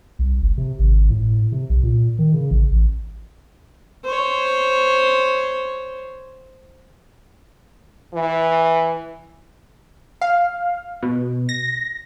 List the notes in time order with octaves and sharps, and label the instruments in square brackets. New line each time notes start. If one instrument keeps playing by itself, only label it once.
[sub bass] C2
F#1
C3
G#1
A2
C3
B1
A#2
D#3
C#3
A1
A1
[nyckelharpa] C5 C#5
[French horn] E3
[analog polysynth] F5
B2
A#6